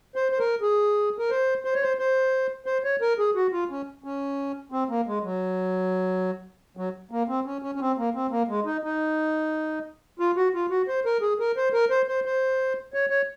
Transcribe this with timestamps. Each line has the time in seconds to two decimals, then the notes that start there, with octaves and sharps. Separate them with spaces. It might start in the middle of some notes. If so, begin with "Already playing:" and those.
0.16 C5
0.32 C5
0.39 A#4
0.61 G#4
1.19 A#4
1.30 C5
1.64 C5
1.74 C#5
1.83 C5
1.99 C5
2.66 C5
2.84 C#5
3.01 A#4
3.19 G#4
3.35 F#4
3.52 F4
3.70 C#4
4.04 C#4
4.72 C4
4.89 A#3
5.07 G#3
5.23 F#3
6.77 F#3
7.11 A#3
7.28 C4
7.46 C#4
7.62 C#4
7.75 C#4
7.80 C4
7.98 A#3
8.15 C4
8.31 A#3
8.48 G#3
8.65 D#4
8.83 D#4
10.19 F4
10.36 F#4
10.54 F4
10.70 F#4
10.88 C5
11.06 A#4
11.21 G#4
11.40 A#4
11.57 C5
11.73 A#4
11.90 C5
12.08 C5
12.25 C5
12.94 C#5
13.10 C#5